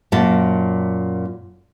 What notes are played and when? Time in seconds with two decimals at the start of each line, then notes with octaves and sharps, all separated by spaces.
0.12 F#2 A#2 A5